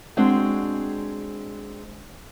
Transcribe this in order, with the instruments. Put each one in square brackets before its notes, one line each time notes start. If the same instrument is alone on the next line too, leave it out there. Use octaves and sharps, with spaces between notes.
[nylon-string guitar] G#3 C4 D4 F#4 G#4 G5